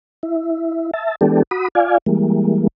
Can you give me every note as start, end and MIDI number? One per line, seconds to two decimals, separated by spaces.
0.23 0.91 64
0.93 1.15 76
0.93 1.15 81
1.21 1.43 52
1.21 1.43 56
1.21 1.43 59
1.21 1.43 62
1.21 1.43 67
1.21 1.43 69
1.51 1.68 66
1.51 1.68 83
1.51 1.68 87
1.75 1.98 65
1.75 1.98 74
1.75 1.98 77
1.75 1.98 80
2.06 2.67 52
2.06 2.67 55
2.06 2.67 56
2.06 2.67 58